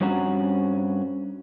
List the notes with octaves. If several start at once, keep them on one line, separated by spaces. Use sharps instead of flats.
G2 C4 C#4 F#4 A#5